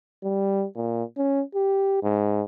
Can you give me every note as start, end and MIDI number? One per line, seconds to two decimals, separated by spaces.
0.23 0.66 55
0.76 1.03 46
1.17 1.42 61
1.55 1.99 67
2.03 2.44 44